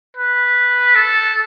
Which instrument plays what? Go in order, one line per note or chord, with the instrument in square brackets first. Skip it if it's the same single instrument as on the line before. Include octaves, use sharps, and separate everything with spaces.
[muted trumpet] B4
A4